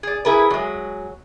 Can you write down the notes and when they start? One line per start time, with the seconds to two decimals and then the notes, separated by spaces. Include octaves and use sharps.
0.03 G#4 D5
0.25 E4 G#4 A#4 B4
0.50 F#3 G#3